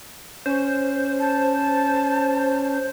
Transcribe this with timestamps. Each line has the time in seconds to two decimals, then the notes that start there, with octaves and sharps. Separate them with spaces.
0.46 C#4 C5
1.19 A5